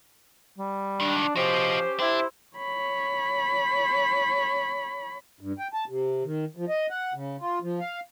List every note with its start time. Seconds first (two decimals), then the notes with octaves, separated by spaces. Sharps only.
0.58 G3
1.00 C#2 D#3 D4
1.36 F3 C#4 F#4 G4 C5 D#5
1.99 D4 E4 G4 C5
2.57 C#5 B5
5.41 G2
5.59 G5
5.73 A5
5.89 C3
6.24 D#3
6.57 F3
6.69 D#5
6.90 F#5
7.14 C#3
7.41 F4
7.62 F3
7.80 F5